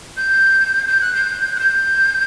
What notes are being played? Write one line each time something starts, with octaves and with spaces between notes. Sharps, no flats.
G6
G6
F#6
G6
F#6
G6